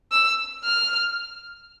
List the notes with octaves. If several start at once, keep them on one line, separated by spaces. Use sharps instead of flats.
E6
F6